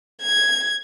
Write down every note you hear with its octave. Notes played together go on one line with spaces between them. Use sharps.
G#6